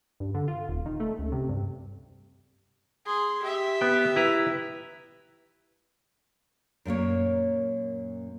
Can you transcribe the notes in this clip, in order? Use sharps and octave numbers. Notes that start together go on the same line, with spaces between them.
G2
D3
F4
D#1
D#3
A3
C#2
C3
G2
G#4 C6
G4 E5
B3 G5
E4 B4 A#5
F#2 A#2 A#3 C#5